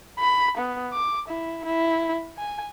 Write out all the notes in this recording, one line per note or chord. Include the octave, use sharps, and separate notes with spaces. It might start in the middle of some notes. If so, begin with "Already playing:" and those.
B5
B3
D6
E4
E4
G#5